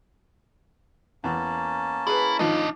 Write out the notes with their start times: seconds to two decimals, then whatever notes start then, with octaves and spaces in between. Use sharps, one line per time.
1.24 E2 A#3 C#4 A5
2.07 E4 G#4 B4
2.39 D#3 F3 D4 D#5